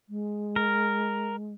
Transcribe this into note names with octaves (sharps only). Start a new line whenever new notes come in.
G#3
A#4